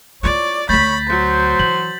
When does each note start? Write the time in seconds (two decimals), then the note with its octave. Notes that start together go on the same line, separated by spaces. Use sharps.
0.23 E4 F4 C#5 D5
0.69 D2 A3 C#5 B5 G6 A6 B6
1.09 F#3 C5
1.59 E3 F#7